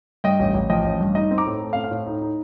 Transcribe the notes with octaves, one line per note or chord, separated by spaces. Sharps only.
G2 D#5 G5
A1
A1
F3 D#5 G5
A1
G2
D#4 D#5
C4
A#5 D6
A2
A3
F5
C4
F5
A2
D#4
D#4